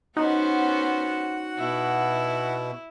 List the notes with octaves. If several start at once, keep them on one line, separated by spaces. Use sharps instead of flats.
B3 C#4 D#4 F#4 C5 F#5
B2 E4